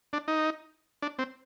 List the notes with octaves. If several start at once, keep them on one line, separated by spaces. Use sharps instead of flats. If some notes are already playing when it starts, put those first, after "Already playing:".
D4
D#4
D4
C4